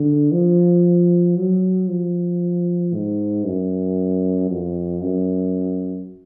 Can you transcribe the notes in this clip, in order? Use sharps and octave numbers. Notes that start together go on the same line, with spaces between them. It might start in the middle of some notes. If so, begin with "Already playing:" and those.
Already playing: D3
F3
F#3
F3
G#2
F#2
F2
F#2